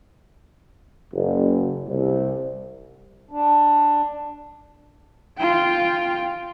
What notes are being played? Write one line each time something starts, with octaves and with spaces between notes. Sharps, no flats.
F#1
C2
D4
F4 G5